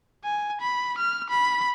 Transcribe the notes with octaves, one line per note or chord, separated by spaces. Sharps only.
G#5
B5
F6
B5